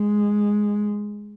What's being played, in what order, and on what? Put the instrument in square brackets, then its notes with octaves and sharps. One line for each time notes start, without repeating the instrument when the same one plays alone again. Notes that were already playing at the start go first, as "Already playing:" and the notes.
Already playing: [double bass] G#3